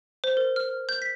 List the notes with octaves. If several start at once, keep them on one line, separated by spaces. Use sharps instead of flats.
C5
A#4
F6
G6
B6